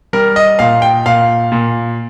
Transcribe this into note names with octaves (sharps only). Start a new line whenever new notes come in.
G3 A#4
D#5
A#2 F5
G5
A#2 F5
A#2